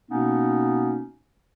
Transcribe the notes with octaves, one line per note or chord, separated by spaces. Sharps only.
B2 A#3 B3 C#4 D#4